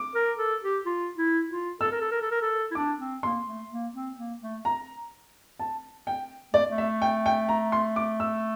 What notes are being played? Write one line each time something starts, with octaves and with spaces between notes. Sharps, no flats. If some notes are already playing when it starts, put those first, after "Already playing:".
Already playing: D6
A#4
A4
G4
F4
E4
F4
A4 E6
A#4
A4
A#4
A4
A#4
A4
E4
D4 D6
C4
A#3 C6
A3
A#3
C4
A#3
A3
A#5
A5
G5
A3 D5
A3
E5
G5
G5
A#5
C6
D6
E6